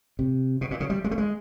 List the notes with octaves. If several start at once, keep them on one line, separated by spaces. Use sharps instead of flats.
C3
B2
A#2
C#3
G3
G#3
A3
G#3